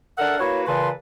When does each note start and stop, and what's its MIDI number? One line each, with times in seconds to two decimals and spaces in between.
0.18 0.39 62
0.18 0.39 69
0.18 0.39 70
0.18 0.39 76
0.18 0.39 78
0.40 0.63 58
0.40 0.63 64
0.40 0.63 66
0.40 0.63 71
0.40 0.63 73
0.67 0.89 46
0.67 0.89 49
0.67 0.89 52
0.67 0.89 71
0.67 0.89 81
0.67 0.89 84